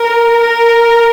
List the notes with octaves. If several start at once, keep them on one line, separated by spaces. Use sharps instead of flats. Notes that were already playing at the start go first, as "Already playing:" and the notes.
Already playing: A#4
A#4